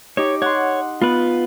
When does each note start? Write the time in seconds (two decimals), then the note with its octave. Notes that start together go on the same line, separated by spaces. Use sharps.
0.17 D#4 G4 C#5 D6
0.42 C#5 F#5 C6
1.02 B3 F4 B4